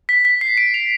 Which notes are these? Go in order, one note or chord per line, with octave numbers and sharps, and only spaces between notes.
B6
B6
C7
D7
F7